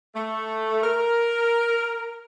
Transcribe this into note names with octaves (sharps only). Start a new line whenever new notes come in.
A3
A#4